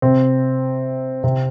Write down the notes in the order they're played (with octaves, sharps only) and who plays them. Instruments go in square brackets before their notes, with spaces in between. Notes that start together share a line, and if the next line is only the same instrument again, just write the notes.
[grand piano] C3 C4
C3 C4